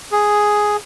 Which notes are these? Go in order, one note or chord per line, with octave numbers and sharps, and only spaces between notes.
G#4